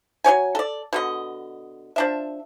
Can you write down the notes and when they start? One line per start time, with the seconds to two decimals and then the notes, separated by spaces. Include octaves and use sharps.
0.24 F#3 E4 C#5 G#5
0.55 A4 D5
0.93 B2 D3 D#5
1.96 F3 D4 E5